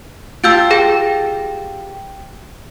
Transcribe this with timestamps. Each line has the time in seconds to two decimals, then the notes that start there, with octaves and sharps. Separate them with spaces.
0.44 F4 G4 A5 E6 G6 D7
0.71 G#4 G5 A#6